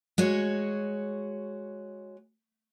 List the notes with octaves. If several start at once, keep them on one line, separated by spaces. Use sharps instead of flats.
G#3 F#4 C#5